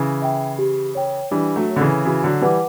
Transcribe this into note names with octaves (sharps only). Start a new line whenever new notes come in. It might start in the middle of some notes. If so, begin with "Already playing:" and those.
Already playing: C#3 E3
E5 G5
G4
C#5 G5
E3 G3 D4
F#3 A3
A4 C#5
D3
C#3 E3
C#3 E3 F#4
D3 F#3
E3 G3 B4 F#5 A5 D6